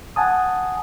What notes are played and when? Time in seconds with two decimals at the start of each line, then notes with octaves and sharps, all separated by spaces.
0.16 F#5 G#5 A5 D#6